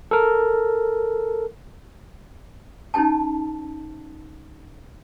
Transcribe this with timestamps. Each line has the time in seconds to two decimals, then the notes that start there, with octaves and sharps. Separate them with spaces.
0.11 A4 A#4
2.94 C#4 D#4 E4 G5 A5